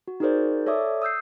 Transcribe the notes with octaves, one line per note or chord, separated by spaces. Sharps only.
F#4
D#4 F#4 G#4 A#4 C5 D5
A4 C#5 D5 E5 D6 D#6
D#6 E6 G6 C7